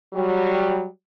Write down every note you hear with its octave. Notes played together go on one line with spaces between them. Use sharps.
F#3 G3